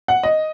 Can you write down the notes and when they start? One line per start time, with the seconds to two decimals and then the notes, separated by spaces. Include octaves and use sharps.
0.08 F#5
0.23 D#5